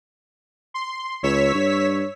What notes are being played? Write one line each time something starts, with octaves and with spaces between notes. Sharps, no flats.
C6
C#2 C#5 E6 B6
G2